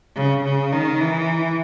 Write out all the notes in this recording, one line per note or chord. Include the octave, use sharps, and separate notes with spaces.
C#3
C#3
D#3
E3